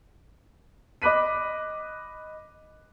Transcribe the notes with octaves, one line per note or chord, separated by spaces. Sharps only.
D#5 B5 D6 F#6 B6 D#7